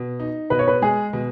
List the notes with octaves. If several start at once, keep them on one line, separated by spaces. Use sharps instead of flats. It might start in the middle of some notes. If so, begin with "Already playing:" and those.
Already playing: B2
D#4
B2 B4
C#5
B4
G#3 G#4
B2